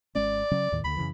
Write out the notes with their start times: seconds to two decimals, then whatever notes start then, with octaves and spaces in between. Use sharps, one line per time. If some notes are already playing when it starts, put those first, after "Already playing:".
0.15 G#1 G#3 C#4 D5
0.51 C#3 F#3 C#4
0.72 D#2 A2 D#3
0.84 D2 D3 B5
0.97 F#2 C#3 E3